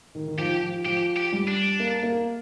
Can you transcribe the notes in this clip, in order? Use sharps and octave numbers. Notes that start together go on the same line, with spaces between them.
D#3
D#3
F3 G4
F3
F3 G4
G4
G3
D4
A#3
A#3